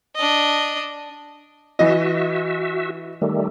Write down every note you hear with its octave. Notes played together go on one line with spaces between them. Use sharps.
D4 D#5
E3 F#4 D#5 E5
D#3 G3 A3